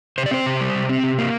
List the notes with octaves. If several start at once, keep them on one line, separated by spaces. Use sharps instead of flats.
C3 C5
D5
C4 C5
C3
G3
C3
C4
C3
A#3